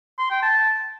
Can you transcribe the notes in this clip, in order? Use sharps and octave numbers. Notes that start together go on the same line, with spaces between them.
C6
G5
A5